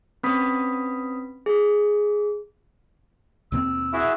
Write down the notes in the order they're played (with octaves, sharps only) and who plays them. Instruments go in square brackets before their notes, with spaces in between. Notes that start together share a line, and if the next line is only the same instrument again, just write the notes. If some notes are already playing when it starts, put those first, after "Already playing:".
[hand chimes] C4 C#4 B4 B5 D#6 B6
G#4
[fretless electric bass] D#2 B2 C4 [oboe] E6
[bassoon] E4 [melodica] F#4 G#4 E5